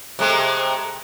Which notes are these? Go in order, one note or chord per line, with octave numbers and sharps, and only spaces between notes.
C3 G#3 A3